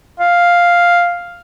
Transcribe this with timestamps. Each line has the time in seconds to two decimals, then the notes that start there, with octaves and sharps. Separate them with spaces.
0.20 F5